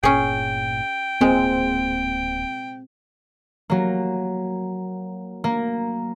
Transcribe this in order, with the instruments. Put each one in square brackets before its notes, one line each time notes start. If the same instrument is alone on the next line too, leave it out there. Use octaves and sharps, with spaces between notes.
[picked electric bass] G1 A#2 [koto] C#4 G#4 [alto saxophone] G5
[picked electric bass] D1 A#3 [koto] A#2 G#3 [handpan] C4
[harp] F#3 A#3
A#3